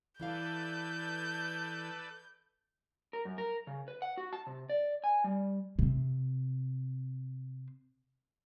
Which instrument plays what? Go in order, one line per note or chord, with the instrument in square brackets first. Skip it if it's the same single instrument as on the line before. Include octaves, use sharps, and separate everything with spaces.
[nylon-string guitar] E3 E4 F5 [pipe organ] A4 B4 D5 [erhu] G6
[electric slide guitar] A#4
F#2
A#4
C#3
B4
F#5
F#4
A5
C3
D5
G#5
G3
[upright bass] C3 C4